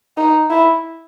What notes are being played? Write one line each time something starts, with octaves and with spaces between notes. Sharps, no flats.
D#4
E4